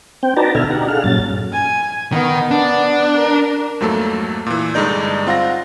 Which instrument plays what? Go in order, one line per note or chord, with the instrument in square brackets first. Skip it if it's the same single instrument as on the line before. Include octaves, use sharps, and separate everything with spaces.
[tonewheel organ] C4 G5
D#4 F#4 B4 D5 A5 A#5
B2 D3 A4 E5 G#5 F6
D4 D#4 G4 F#5 A#5
G#4 A4 F5 F#5 F6
G2 A#2 F#3 C#4 A6
[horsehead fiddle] G#5
[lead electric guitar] D#3 [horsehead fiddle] B3
[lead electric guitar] D4
[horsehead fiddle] A#4
[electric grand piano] F2 G#2 F#3 A3 A#3 A4
A#2 E3
G2 D3 G#3 D#4 D5 G6
C4 F4 F5 F#5 A#6